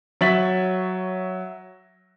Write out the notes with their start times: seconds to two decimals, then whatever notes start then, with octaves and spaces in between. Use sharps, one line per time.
0.21 F#3 C#5 E5 A6 B6 F#7